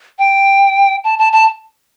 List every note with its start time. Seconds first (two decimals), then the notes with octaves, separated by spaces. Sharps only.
0.19 G5
1.04 A5
1.19 A5
1.33 A5